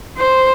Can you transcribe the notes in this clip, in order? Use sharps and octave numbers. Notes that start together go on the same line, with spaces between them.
C5